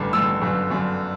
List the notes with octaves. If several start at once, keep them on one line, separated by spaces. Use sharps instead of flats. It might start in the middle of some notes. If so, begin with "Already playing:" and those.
Already playing: A1 G2 D3 D6
A1 G2 D3 E6
G1 F#2 D3
G1 F#2 D3